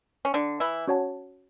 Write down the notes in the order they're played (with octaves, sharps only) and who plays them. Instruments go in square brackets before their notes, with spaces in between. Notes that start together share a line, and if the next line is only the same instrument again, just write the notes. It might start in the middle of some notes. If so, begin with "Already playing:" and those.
[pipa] C#4
D3 D4
E3 E4
[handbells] C#4 F#4 C#5 F#5 A5